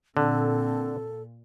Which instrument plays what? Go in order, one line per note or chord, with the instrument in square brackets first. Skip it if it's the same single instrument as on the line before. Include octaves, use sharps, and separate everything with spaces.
[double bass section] A#2 [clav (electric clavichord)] D3 [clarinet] C4 [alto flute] A4